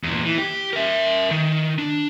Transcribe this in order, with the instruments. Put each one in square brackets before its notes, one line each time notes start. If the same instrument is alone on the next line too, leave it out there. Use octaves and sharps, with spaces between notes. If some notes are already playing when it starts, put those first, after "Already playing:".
[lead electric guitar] E2 A#2
E3
G4
A#4 E5
D#3
D4